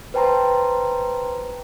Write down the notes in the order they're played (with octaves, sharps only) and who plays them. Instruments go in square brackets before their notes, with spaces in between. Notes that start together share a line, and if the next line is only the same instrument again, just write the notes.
[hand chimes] B4 C5 G5 A5 A#5 C6